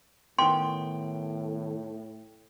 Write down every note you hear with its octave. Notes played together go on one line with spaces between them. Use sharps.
A2 D#3 B3 G5 C6